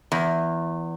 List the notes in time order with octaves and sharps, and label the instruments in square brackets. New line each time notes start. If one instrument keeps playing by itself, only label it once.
[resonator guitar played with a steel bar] E2